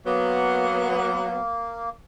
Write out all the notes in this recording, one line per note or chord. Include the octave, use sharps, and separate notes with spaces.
F#3 A#3 B3